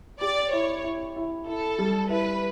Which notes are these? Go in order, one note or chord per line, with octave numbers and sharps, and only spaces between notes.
G4 D5
E4 C#5
E4
E4
E4 A4
G3
E4 B4